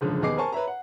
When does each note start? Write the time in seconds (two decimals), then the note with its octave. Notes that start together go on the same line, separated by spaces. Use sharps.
0.01 F#1 G#2 D3 F3
0.22 D#2 B3 G#4 D#5 D6 C7
0.38 A#4 C5 G#5 A5 C#6
0.52 B4 C#5 E5 A#5
0.67 F#5